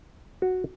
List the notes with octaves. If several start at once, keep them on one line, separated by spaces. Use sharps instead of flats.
F#4